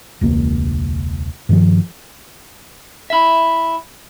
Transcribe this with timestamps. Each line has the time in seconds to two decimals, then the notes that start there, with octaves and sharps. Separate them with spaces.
0.21 E1 C#2 A#3
1.49 G2 D#3 F3
3.10 E4 E5